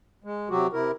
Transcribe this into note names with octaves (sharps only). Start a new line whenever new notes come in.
G#3
C3 F#3 F#4 G4
C3 E4 A#4